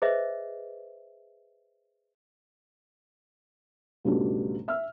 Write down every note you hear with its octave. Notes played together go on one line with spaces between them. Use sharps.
G#4 B4 C5 D#5 E5
C#2 G#2 B2 G3 A3 D4
E5 E6 F6